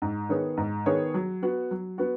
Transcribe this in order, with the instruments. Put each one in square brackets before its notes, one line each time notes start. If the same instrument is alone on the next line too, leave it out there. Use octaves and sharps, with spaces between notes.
[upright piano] G#2
D#3 B3 G#4 C#5
G#2
D#3 B3 G#4 C#5
F#3
B3 F#4
F#3
B3 F#4